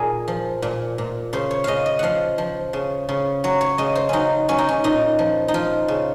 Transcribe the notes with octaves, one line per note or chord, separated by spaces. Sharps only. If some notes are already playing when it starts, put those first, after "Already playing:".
Already playing: A#2 G#4 A#4
F3
A#2
A#2
C#3 C5
C#5
C#3 D#5 F5
D#5
F3 F5 F#5
F3
C#3
C#3
F#3 C#5
C#5
C#3 D#5
C5
F#3 C#4 D#4
F#3 C#4
D#4
C#4
A#2 D#4
F3
D#4
F3 F4
C#3